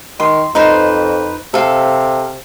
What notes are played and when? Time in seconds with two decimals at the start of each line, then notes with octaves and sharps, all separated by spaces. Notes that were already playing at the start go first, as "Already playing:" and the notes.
0.20 D#3 C6
0.55 F2 D#4 B4 C5
1.54 C3 A4 F5